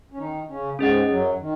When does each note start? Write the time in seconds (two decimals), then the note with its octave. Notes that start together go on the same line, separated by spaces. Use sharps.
0.12 C#4
0.18 D#3 D#4
0.48 C#3 C#4
0.79 G#2 G#3 C#4 G#4 D#5 F#5
1.09 F#2 F#3
1.39 D#3